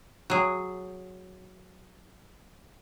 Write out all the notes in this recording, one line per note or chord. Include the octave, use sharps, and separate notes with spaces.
F#3 G#4